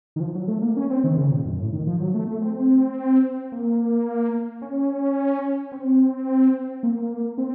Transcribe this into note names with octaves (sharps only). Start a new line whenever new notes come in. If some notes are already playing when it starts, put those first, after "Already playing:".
D#3
F3
F#3
A3
A#3
C#4
C4
D#3
C#3
A#2
F#2
A2
D#3
F3
F#3
A3
A3
C4
A#3
C#4
C4
A#3
C4